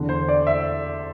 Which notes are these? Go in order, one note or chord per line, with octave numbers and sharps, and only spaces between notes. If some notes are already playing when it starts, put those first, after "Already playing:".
Already playing: E2 D3
C5
D5
E5